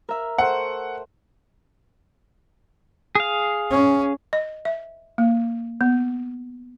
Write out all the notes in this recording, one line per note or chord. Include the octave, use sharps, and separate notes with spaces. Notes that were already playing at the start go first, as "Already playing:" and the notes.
A#4 E5
A3 C5 F#5
G#4 F5
C#4
D#5
E5
A#3
B3